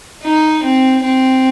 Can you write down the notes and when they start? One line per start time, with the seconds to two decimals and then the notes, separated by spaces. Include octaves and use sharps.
0.23 D#4
0.63 C4
1.03 C4